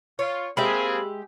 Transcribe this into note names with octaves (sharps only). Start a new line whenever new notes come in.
F4 C#5
G#3 A#3 C4 G4 G#4 E5 B5